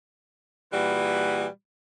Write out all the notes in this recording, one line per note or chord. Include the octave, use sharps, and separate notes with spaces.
A#2 E3 G3 F#4 G#4 B4